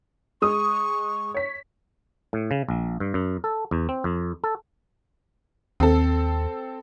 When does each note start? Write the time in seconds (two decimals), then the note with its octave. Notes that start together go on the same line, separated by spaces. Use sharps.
0.42 G#3 C#6 D#6
1.34 C#5 B6
2.33 A2
2.51 C#3
2.69 A#1
3.00 G2
3.14 F#2
3.44 A4
3.71 E2
3.89 C4
4.04 F2
4.44 A4
5.80 D#2 C4 A4